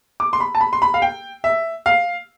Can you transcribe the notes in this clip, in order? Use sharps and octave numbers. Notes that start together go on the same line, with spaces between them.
D6
C6
B5
A5
B5
C6
B5
F5
G5
E5
F5